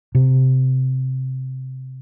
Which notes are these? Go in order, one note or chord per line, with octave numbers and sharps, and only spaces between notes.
C3